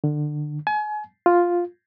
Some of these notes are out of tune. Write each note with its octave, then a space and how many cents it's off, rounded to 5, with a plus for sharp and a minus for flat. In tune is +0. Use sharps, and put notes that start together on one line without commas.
D3 +25
G#5 +35
F4 +5